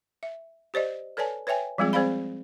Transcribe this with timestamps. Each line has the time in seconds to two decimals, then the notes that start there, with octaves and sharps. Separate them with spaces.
0.23 E5
0.74 G4 C5 D5 D#5
1.17 A4 B4 C#5 D5 G#5 A5
1.47 B4 C#5 E5 G5 G#5
1.78 F3 G3 G#3 C4 F4 G#4
1.93 C4 G#4 C5 D5 F5 B5